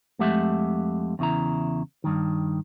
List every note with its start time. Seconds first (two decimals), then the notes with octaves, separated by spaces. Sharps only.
0.19 F2 G#3 A3 G4 E5 F#5
1.19 E2 C#3 E4 A#5
2.04 G2 D#3